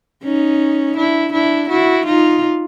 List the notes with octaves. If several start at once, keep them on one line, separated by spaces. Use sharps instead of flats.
C#4 D#4
D4 E4
D4 E4
E4 F#4
D#4 F4